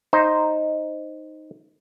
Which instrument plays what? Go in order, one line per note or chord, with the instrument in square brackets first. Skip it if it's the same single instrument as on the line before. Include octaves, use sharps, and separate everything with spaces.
[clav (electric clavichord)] D#4 C5